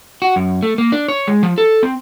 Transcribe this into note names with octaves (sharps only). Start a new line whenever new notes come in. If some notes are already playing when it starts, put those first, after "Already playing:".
F#4
F#2
A3
A#3
D4
C#5
G#3
F3
A4
C4